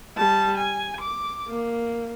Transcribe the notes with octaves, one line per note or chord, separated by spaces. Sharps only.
G3 A5
G#5
D6
A#3